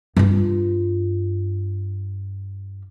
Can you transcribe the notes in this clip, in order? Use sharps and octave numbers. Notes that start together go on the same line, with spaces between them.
G2 F4